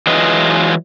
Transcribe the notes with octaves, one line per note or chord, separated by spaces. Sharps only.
E3 F#3 G#3 F4 B4 D#5